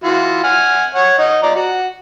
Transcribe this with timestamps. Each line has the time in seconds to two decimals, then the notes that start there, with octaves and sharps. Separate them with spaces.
0.04 E3 F4 F#4
0.44 F#5 G#5 F6
0.94 C#5 F#5
1.19 D#4 D#5 F#5
1.43 F3 D5 A#5
1.56 F#4 F#5